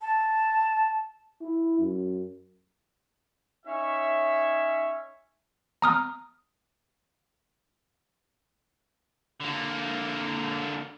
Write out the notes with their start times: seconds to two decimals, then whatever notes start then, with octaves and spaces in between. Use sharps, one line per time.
0.02 A5
1.41 E4
1.79 F#2
3.66 C#4 D#4 C#5 E5
5.82 A#5 D#6 F6
9.40 D3 A#3